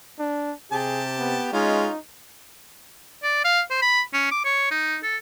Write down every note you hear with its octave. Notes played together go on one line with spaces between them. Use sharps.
D4
C3 G4 G#4 A5
B3
G#3 C#4 D#4 F4
D5
F5
C5
B5
C#4
D6
C#5
D#4
A4